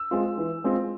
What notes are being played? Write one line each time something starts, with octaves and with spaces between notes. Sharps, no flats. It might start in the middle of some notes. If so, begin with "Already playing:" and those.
Already playing: E6
G#3 C4 F4
E3
G#3 C4 F4